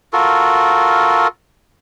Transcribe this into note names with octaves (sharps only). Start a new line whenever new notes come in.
F4 F#4 A4 A#4